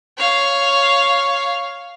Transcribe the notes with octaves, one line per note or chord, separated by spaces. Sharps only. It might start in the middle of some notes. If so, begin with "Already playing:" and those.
C#5 F5